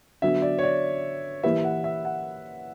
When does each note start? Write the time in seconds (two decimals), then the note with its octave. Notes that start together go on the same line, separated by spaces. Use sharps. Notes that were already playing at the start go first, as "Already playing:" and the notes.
0.22 D3 F#3 B3 F#4 E5
0.42 D5
0.59 C#5
0.63 D5
1.43 E3 A#3 E4 G4 B4 E5
1.64 F#5
1.84 E5
2.05 F#5